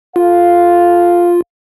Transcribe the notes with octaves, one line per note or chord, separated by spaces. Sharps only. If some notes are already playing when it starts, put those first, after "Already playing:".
F4 A4 F5